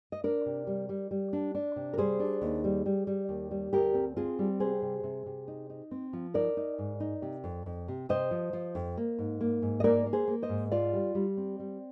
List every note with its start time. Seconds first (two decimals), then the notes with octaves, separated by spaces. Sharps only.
0.12 D#5
0.24 D4 A#4 D5
0.46 C3
0.67 G3
0.89 G3
1.11 G3
1.33 D4
1.55 D4
1.76 C3
1.93 A#4
1.98 G3 G#4 C5
2.20 D4
2.42 D#2
2.64 G3
2.86 G3
3.07 G3
3.29 D#2
3.51 G3
3.72 D2 G4 A#4
3.94 C4
4.16 C4 F4 G#4
4.39 G3
4.60 C3 G#4 C5
4.82 C3
5.03 C3
5.26 C3
5.48 D#4
5.70 D#4
5.91 C4
6.13 F3
6.34 D#4 A#4 D5
6.57 D#4
6.78 G#2
7.00 D#4
7.22 C3
7.44 F2
7.66 F2
7.88 C3
8.09 C3 C5 D#5
8.31 F3
8.53 F3
8.75 F2
8.97 A#3
9.19 G#2
9.41 A#3
9.62 G#2
9.80 D#5
9.84 A#3 A#4 D5
10.06 A#3
10.13 G#4 C5
10.28 A#3
10.42 C5 D#5
10.49 G#2
10.71 F4 D5 F5
10.93 G3
11.15 G3
11.37 C4
11.59 G3